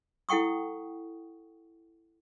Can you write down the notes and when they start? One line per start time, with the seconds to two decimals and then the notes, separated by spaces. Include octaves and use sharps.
0.29 E4 A4 F#5 G5 C#6 D#6